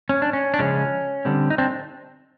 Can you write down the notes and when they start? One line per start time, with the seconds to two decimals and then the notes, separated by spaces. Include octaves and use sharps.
0.09 C#4
0.22 D4
0.33 C#4
0.54 D4
0.59 C#3 F3 G#3 C#4
1.25 D3 G3 C4
1.50 D#4
1.58 C4 D4